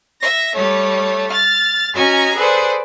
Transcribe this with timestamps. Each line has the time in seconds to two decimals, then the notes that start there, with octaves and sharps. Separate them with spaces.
0.20 E5 A#6
0.54 G3 A3 C#5
1.30 F6 A6
1.94 C#4 F#4 D#5 G#5 A#5
2.35 G#4 A4 B4 C5 D5